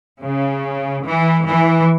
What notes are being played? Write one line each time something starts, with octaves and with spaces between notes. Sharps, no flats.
C#3
E3
E3